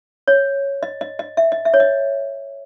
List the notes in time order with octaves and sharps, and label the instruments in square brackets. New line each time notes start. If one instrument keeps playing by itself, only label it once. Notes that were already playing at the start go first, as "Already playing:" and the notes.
[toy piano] C#5
D#5
D#5
D#5
E5
D#5
E5
C#5
D#5